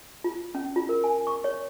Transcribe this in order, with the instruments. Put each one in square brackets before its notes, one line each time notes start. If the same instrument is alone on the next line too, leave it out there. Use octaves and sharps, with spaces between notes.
[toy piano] F4
C#4
F4
A#4
G#5
C#6
C#5